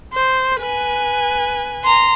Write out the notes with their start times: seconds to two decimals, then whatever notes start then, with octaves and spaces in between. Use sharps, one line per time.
0.12 C5
0.61 B4 G#5
1.84 A#5 C6